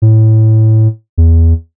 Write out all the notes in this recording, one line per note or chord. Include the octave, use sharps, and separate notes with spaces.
A2
E2